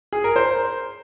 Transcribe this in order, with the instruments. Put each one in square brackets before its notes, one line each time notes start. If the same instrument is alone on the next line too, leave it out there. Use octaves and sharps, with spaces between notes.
[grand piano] G#4
A#4
C5